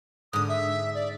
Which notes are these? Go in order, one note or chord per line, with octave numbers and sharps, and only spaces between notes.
G#2 D3 D#6
E5
D5